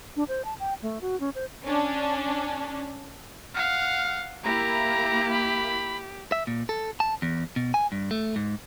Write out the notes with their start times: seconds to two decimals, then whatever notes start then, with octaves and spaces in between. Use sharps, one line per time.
0.16 D4
0.28 C5
0.45 A5
0.60 G5
0.83 A3
1.01 F#4
1.20 C#4
1.35 C5
1.64 C#4 D4
3.55 F5 F#5 F6
4.44 A#3 E4 G4 A#5
5.31 B5
6.32 E5
6.47 A#2
6.69 A4
7.00 A5
7.22 E2
7.56 B2
7.74 G#5
7.92 G2
8.11 A3
8.36 G#2